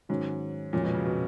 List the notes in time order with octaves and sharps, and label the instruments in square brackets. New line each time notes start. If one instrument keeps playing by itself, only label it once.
[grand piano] G#2 [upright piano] D#3 F#3 C#4 F#4
[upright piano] F2 F3 G#3 C#4 F#4 [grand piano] A#2
[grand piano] B2
C#3
B2